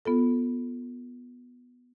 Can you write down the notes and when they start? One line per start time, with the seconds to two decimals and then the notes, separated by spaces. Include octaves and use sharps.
0.05 B3 F4 A4